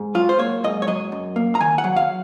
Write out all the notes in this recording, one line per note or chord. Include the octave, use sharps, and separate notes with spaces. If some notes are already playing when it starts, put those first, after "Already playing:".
Already playing: G#2
F#3 F4
C5
A#3 C#5
G#2 D#5
C#5
F#3 D#5
F#2
A#3
A#5
D#3 G#5
F#5
F#3
F5